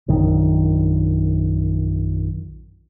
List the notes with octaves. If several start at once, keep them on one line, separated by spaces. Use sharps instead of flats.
A#1 F#2 D#3